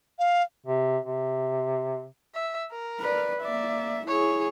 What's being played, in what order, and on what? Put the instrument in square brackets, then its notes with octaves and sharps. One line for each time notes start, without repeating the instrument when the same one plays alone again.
[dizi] F5
[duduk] C3
C3
[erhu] E5
A#4
[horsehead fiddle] B4 D5
[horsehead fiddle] A#3 E5 [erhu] D5
[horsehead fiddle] E4 G#4 [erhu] C#5